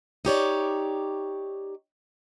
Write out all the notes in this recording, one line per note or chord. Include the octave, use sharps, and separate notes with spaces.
D#4 G4 C#5 D5